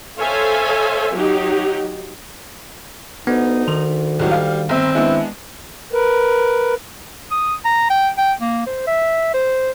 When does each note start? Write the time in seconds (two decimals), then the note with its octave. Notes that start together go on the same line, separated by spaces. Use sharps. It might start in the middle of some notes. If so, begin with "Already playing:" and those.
0.19 A4 C5 C#5 E5 F5 G#5
1.13 F#3 D#4 G4
3.27 D2 B3 D#4
3.68 D#3 F7
4.19 C#2 A2 F#3 G3
4.31 F5
4.69 G1 C4 E5
4.95 G#3 B3 D4 E4
5.93 A#4 B4
7.31 D#6
7.65 A#5
7.90 G5
8.18 G5
8.40 A#3
8.67 C5
8.87 E5
9.34 C5